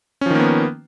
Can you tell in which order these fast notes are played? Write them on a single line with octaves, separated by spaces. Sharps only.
C#4 F3 D#3 A#3 B3